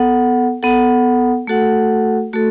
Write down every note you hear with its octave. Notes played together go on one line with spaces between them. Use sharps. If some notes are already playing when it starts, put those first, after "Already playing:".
Already playing: B3 A4 F#5
B3 A4 F#5
A3 F#4 A4 F#5
A3 F#4 A4